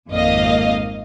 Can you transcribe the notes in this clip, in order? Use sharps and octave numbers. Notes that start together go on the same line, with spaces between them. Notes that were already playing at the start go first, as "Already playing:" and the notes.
G#1 F2 A#3 D#5 F5